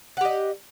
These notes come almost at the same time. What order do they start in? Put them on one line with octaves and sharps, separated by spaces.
F#5 G4 D#5